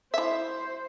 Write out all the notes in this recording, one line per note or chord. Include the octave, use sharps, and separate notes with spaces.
E4 C5 E5